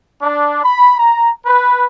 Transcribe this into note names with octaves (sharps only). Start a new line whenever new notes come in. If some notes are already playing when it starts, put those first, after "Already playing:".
D4
B5
A#5
B4